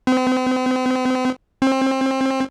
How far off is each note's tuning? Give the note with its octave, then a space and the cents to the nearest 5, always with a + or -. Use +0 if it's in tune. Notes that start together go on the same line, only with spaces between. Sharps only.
C4 -40
C4 +25